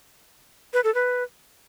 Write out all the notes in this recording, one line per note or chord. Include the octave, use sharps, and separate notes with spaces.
B4
A4
B4